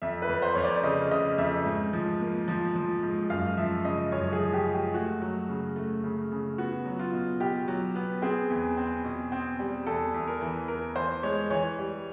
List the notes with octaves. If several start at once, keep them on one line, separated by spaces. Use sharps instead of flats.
F2 E5
B4
F2
C5
F2 C#5
D5
C#3 D#5
C#3 D#5
F2 E5
G#2
F3
A#3
F3
F3
G#2
F#2 F5
F3 E5
C#3 D#5
F#2 C#5
G#4
F3
G4
G#3
G4
A3 F#4
F#3
C#3
A3
C#3
C#3
B3 F#4
F#3
F4
B2
B2 G4
F#3
B3
C4 G#4
E2
C4
B2
C4
G3
E2 A4
E2
A#4
E3
E2 A#4
E3 C5
G#3 C#5
E3 C#5
G3